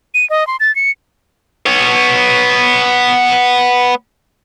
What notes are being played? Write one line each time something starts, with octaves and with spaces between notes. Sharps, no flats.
D#7
D#5
C6
A6
C#7
B3 C#5